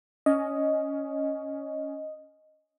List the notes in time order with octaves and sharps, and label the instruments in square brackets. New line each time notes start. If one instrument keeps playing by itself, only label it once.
[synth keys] C#4 [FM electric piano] D#5